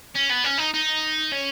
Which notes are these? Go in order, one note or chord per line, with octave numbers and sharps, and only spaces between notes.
C#4
B3
C#4
D#4
D#4
C#4